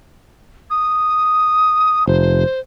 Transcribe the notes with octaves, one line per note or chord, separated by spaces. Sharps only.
D#6
F1 C5